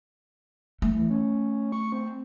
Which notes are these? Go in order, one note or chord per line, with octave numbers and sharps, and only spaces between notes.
A3
E3
C#4
C#6
C4